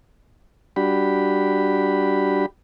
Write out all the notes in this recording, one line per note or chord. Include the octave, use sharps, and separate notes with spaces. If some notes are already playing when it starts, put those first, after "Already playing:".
G3 D4 F#4 G4 B5